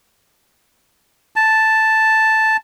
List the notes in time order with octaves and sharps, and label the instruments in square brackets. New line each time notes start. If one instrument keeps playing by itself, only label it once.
[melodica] A5